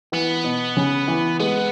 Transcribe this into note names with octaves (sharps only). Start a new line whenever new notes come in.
E3 B3
B2
C#3
E3
G#3 B3